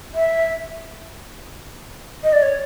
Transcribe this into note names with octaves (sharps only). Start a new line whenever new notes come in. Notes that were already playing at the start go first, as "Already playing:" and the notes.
E5
D#5
D5
C#5